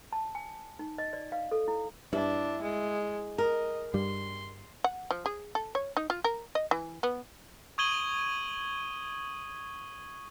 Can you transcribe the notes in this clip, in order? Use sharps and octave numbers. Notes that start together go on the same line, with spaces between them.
A5
G#5
D#4
D#5
D5
F5
A4
E4
G2 D4 E4
G#3
A#4 D#5
G2 G3 C6
F#5
F3
G#4
A4
C#5
D#4
F4
A#4
D#5
E3
B3
C#6 D#6 G#6 D#7 F#7 G7